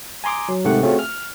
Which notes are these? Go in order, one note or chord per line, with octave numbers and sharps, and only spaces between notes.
G#5 A#5 C6 D6 D#6
F#3
G#2 C3 D#3 A3 G4 F#5
A3 C4 C#4 F4 F#4 G#4
F6